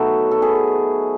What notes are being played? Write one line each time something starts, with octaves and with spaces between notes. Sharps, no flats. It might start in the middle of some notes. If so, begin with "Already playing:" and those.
Already playing: B2 F#3 A3 D#4 F#4 A4 B4
A4
G#4 B4